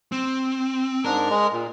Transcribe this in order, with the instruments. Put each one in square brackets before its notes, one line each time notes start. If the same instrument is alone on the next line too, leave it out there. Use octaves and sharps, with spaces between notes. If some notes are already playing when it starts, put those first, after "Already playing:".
[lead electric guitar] C4
[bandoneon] G#2 D4 [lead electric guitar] A#4
[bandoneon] G#3
A#2